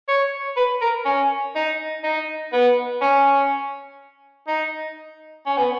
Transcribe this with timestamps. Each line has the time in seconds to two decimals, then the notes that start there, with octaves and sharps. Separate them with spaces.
0.08 C#5
0.56 B4
0.81 A#4
1.05 C#4
1.55 D#4
2.04 D#4
2.53 B3
3.02 C#4
4.48 D#4
5.46 C#4
5.57 B3